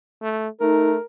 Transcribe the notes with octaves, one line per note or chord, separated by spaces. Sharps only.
A3
A3 D#4 A#4